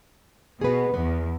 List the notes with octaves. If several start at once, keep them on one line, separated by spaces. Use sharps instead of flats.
B2 G#4 B4
E2 B3